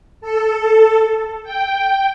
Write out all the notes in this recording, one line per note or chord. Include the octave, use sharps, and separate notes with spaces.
A4
G5